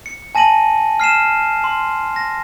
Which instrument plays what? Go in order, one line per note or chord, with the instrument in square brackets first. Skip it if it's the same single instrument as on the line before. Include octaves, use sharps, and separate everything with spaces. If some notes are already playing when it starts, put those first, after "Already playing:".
[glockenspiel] C#7
G#5 A5 A#6 D#7 F#7
F6 C7 D#7 E7
C6
A#6